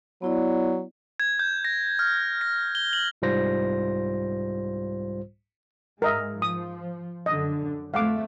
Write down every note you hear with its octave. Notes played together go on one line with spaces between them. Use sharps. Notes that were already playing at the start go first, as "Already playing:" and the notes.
F#3 B3 E4 D5
G#6
G6
A#6
F6
A#6
G7
F#7
C2 G#2 G3 F4 C5 A#6
G#2 G#3 A#4 D#5 E5
F3 D#6
F#2 D3 D#5
F2 A3 F5 F#5 D6